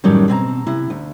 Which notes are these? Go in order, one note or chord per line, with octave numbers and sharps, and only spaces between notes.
F#2 A2 D#3 F#3 G3
B2 C4 G#5 A#5
C3 E4
D2